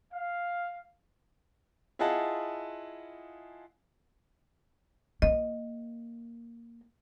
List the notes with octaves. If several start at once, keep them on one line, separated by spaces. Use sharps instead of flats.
F5
E4 F4 G#4 D#5 F#5 A5
A#3 D#5